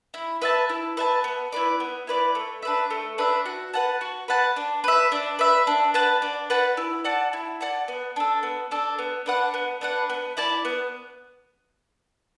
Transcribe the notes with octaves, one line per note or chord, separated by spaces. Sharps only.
E4
B4 E5 A5
E4
B4 E5 A5
B3
E4 B4 D5
B3
E4 B4 D5
A3
D4 B4 E5
A3
D4 B4 E5
F#4
B4 F#5 A5
F#4
B4 F#5 A5
D4
B4 E5
D4
B4 E5
D4
B4 F#5 A5
D4
B4 F#5 A5
E4
D5 F#5 A5
E4
D5 F#5 A5
B3
D4 A4
B3
D4 A4
B3
D4 B4 F#5
B3
D4 B4 F#5
B3
E4 D5 A5
B3